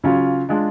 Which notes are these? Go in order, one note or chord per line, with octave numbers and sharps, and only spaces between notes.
C#3 F#3 C#4 F4
G#3 D4 F4